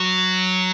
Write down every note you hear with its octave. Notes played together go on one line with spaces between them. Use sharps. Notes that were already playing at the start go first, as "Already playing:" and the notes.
Already playing: F#3